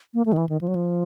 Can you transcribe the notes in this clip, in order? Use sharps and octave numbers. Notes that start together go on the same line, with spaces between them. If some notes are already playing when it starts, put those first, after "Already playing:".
A#3
A3
D#3
E3
D#3
F3
F#3
F3